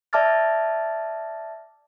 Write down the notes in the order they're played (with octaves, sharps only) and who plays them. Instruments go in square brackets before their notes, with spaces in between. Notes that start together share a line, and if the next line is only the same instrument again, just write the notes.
[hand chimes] D5 E5 A5 D6 F6 A6